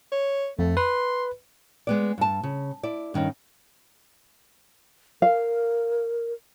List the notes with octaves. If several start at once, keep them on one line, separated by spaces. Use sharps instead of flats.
C#5
F2 A3
B4 C6
G#3 B3 D5
G2 A5
C#3
E4 D5
G2 D#3 C#4 D#4
A#4 F5